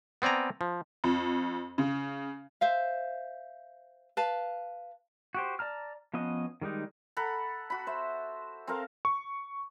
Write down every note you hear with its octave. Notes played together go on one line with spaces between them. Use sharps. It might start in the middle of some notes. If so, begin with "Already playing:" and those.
B3 C4 D5 G#5 A#5
F3
F2
C#3
C5 E5 F5
B4 F5 A5
F#4 G4 C5
D5 A5 A#5 F6
F3 B3 C#4 D#5
D#3 G3 G#3 D#4
A4 F#5 A#5 B5
F#4 B5
C5 E5
C4 A4 A#4 F5
C#6